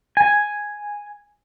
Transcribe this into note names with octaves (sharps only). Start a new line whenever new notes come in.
G#5